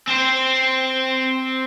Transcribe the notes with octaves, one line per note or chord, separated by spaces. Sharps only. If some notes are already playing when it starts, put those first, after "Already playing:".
C4 C5